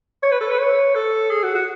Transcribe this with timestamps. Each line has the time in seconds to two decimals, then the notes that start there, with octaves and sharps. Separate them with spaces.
0.23 C#5
0.31 B4
0.41 A4
0.50 B4
0.59 C#5
0.95 A4
1.31 G#4
1.43 F#4
1.55 F#4